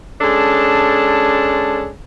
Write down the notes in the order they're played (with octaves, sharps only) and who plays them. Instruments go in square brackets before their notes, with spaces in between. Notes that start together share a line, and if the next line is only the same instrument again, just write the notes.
[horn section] G#3 C#4 D4 A4 A5